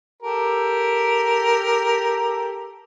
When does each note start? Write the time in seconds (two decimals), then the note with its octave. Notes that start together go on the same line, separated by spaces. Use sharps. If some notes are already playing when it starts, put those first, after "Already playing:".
0.22 G4 A4 A#4